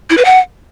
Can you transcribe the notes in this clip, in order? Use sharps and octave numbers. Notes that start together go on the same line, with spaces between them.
E4
B4
F#5